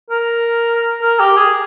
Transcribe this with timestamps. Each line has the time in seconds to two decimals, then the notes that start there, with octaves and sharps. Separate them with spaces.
0.10 A#4
1.02 A#4
1.19 G4
1.37 G#4